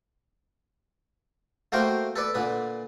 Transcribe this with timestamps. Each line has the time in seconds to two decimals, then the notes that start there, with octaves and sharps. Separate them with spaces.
1.72 A3 A#3 F#4 C5 F5 G5
2.16 A4 B4 D5
2.35 A#2 D3 B4